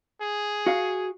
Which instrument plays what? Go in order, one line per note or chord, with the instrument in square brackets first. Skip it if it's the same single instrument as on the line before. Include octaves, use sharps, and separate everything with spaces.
[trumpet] G#4
[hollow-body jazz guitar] F#4 F5